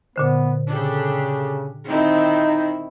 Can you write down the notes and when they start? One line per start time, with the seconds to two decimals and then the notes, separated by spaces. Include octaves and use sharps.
0.16 A#2 D3 B3 C5
0.69 C#3 D4 G4 A4
1.87 D#3 C4 D#4 E4